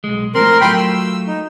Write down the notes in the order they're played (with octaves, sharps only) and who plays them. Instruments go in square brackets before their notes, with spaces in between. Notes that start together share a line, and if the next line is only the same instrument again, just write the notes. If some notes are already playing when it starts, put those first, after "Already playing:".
[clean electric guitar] B1 G#3
[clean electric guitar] A2 F3 C4 [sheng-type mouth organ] A#4 C6
[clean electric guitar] F#3 A3 F4 [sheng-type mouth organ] G5 B5 C6
[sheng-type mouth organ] E6
D#4